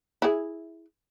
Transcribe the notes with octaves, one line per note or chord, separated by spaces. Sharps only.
E4 G#4